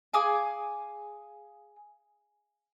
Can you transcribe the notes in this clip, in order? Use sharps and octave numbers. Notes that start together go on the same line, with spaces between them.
G#4 F5 G#5 D6